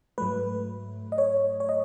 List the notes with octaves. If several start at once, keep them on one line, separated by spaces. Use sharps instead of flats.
G#2 F#3 A3 B4
D#5
C#5
C#5
D#5